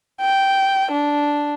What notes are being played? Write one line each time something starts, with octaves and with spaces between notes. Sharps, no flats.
G5
D4